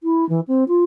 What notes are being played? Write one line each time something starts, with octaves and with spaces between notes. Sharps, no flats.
E4
E3
C4
F4